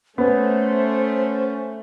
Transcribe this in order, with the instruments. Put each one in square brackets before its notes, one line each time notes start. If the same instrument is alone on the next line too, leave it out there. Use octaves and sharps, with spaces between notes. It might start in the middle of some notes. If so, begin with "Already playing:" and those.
[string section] A3 [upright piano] B3 [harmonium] C#4 [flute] C5